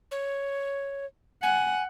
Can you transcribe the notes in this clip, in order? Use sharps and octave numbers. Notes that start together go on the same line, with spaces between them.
C#5
F#5 G#5